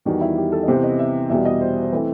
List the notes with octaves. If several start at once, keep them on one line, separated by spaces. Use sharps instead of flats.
E2 D#3 G3 F#4
E4
G4
A4
D#5
C3 E3 B3 C5
D#5
E5
E2 B2 G3 E5
D#5
C5
C5
E3 A3 C4 B4